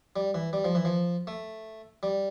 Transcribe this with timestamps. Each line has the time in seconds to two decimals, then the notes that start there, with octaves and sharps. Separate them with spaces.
0.16 G3
0.34 E3
0.53 G3
0.64 F3
0.75 E3
0.85 F3
1.27 A3
2.03 G3